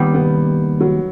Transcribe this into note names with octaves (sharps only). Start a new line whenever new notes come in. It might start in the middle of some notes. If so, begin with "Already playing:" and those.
Already playing: D#2 D#3 G3 B3
B3
F#3